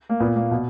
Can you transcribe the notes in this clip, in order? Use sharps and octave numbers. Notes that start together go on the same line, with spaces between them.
A#3
A#2 B3
A#3
B2